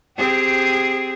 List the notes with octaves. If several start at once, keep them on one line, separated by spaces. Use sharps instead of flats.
C4 G4 G#4